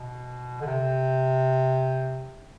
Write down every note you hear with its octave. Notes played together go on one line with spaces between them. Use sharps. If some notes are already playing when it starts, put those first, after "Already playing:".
Already playing: B2
D3
C3